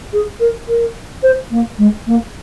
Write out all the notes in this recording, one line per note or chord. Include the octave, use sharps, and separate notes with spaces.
G#4
A#4
A#4
C5
A#3
G#3
A#3